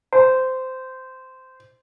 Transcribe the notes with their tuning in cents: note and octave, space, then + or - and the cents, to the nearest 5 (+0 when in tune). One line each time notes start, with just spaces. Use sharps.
C5 -15